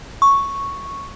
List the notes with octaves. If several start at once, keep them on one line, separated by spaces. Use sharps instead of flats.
C#6